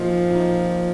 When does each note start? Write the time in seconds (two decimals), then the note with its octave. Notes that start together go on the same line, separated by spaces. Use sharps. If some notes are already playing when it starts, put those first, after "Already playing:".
Already playing: A#2 F3 A#3 D#4
0.31 A#2 A#3 D#4